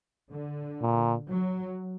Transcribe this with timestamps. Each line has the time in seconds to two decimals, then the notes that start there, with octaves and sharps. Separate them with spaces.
0.32 D3
0.81 A#2
1.30 F#3